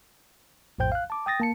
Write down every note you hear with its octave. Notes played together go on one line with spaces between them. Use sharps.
A#1 F2 A2 C5 G5 G6
F5 F#6
A5 D6
G5 D#6 A6 A#6
A#3 A5 C#7